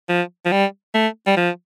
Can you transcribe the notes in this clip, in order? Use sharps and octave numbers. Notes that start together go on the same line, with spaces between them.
F3
F3
G3
A3
G3
F3